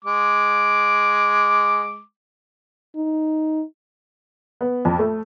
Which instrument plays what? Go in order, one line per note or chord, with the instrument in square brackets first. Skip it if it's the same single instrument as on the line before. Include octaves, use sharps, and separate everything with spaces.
[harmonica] G#3 D6
[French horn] D#4
[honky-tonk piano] B3
F2
A3